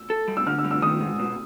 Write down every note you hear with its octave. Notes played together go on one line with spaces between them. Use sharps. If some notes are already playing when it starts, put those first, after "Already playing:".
Already playing: E6
A4
G3
E6
D3 F6
E6
G3
E6
D#3 D#6
G#2
B2